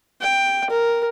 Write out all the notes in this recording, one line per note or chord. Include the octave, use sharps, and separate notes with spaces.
G5
A#4